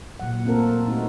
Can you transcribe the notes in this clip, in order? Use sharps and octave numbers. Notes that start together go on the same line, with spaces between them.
A#2 F#3 F#5
A3 A#3 C4 F4 A4 A#4
A3 C4 D#4 F4 F#4